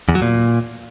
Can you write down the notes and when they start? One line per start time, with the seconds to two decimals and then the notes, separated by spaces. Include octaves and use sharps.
0.09 E2
0.15 F#3
0.22 A#2